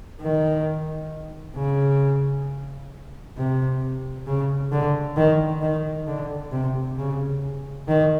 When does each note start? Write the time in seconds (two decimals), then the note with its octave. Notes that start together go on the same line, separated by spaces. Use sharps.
0.21 D#3
1.56 C#3
3.37 C3
4.27 C#3
4.72 D3
5.17 D#3
5.62 D#3
6.07 D3
6.52 C3
6.98 C#3
7.88 D#3